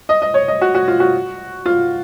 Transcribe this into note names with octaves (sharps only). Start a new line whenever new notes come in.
D#5
D#5
C#5
D#5
F#4
F#4
F4
F#4
F4